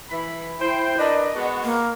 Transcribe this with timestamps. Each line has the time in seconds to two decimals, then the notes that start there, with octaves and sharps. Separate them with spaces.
0.10 E3 B5
0.60 E4 C5 G5
0.98 D4 A#4 B4 D#5
1.35 G#3 B3 F#4
1.64 A#3